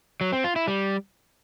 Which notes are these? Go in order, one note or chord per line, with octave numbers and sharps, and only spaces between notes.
F#3
C4
F4
E4
G3